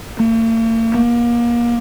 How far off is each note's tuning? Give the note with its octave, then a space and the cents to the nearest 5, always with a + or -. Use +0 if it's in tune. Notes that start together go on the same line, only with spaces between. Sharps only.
A#3 -45
A#3 +30